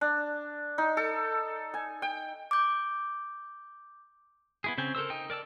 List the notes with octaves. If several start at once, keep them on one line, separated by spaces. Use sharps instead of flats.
D4
D#4
A4
G#5
G5
D6 G6
B3 E4 G#4
C#3 C4 G5 G#5
A4 A#4 C5 E6
D#4 G5
A#4 D5 A5 E6